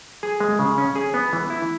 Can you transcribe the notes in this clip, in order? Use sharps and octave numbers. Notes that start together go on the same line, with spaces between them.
G#4
G#3
C#3
C#4
G#4
B3
E3
E4